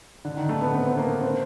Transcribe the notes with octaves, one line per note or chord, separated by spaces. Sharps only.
D3
D#3
A3
B3
C4
B3
A#3
C4